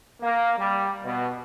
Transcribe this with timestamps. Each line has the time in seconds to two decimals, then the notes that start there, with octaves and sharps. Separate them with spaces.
0.21 A#3
0.57 G3
1.04 B2